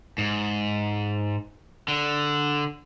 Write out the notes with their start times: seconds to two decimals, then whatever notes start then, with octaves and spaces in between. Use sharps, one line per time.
0.18 G#2
1.88 D3